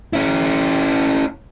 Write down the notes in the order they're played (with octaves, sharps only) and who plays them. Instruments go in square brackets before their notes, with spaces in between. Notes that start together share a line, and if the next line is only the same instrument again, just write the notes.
[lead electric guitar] C#4 E4